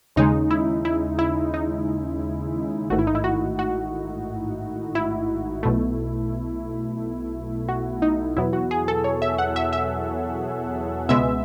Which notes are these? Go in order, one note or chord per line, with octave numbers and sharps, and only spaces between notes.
D#2 C#3 G#3 D#4
E4
E4
E4
D#4
A1 G#2 D#3 A3 F#4
E4
D#4
E4
F#4
F#4
E4
B1 B2 A3
F#4
D#4
E2 B2 F#3 B3 E4
F#4
G#4
A4
C#5
E5
F#5
E5
E5
C#2 B2 G#3 B3 E5